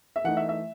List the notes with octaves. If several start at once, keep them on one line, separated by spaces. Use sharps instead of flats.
E5
E3 A3 D#4 F#5
E5
E5